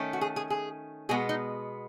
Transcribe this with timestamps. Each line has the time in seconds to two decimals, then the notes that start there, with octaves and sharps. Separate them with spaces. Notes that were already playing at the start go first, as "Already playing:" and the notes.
Already playing: D#3 A3 C#4
0.13 F#4
0.21 G#4
0.36 G#4
0.50 G#4
1.09 B2 G#3 B3 G#4
1.29 D#4